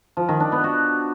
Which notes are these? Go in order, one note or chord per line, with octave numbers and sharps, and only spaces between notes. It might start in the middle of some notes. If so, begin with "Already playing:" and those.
F3
D#3
D4
B3
F#4